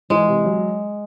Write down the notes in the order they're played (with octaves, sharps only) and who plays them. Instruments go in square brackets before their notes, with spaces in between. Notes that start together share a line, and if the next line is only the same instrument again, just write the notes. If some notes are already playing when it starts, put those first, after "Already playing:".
[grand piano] E3 [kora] G#3
[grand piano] C3
F#3